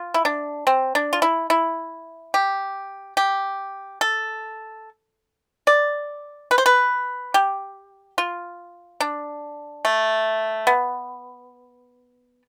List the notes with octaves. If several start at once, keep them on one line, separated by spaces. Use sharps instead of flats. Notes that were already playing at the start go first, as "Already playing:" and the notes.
Already playing: F4
E4
D4
C4
D4
F4
E4
E4
G4
G4
A4
D5
B4
C5
B4
G4
F4
D4
A3
B3